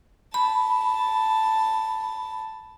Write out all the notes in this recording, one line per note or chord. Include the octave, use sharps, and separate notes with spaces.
A5 B5